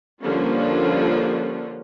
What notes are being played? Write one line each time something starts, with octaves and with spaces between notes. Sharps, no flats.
D3 F3 G3 A#3 C#4 F4